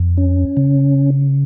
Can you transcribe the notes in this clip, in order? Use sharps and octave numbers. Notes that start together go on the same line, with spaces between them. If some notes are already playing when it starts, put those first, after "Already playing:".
Already playing: F2
C#4
C#3